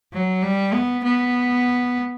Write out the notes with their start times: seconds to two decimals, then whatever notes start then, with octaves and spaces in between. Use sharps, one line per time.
0.13 F#3
0.43 G3
0.73 B3
1.04 B3